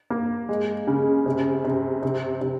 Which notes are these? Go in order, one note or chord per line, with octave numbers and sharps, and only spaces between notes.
A#3
G#3
C#3
C3
C3
C3
C3